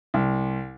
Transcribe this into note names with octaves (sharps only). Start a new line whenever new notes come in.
C2